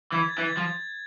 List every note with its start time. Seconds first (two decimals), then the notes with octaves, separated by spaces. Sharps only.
0.12 E3 G#6
0.29 A6
0.38 E3
0.46 A6
0.57 F3